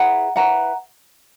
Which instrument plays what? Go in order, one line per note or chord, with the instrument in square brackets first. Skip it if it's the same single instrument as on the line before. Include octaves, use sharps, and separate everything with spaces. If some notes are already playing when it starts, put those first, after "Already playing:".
Already playing: [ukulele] E4 G#4 B4 F#5 A#5
E4 B4 F#5 A#5